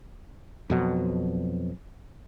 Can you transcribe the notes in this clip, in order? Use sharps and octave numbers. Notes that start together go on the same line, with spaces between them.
F2 B2 F#3